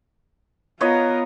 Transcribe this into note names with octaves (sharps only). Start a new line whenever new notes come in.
B3 F4 A#4 C#5 D#5